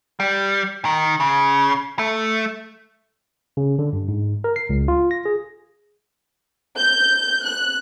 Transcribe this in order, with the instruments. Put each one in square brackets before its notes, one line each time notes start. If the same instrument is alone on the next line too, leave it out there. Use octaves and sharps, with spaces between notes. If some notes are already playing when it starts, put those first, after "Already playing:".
[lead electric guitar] G3
D#3
C#3
A3
[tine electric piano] C#3
D3
G2
G#2
A#4
C7
C#2
F4
A#6
G#4
[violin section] G6
F#6